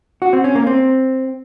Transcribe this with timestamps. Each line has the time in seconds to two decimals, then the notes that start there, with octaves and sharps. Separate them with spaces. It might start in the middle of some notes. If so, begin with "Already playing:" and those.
0.22 F#4
0.33 C4
0.44 C#4
0.55 A#3
0.67 C4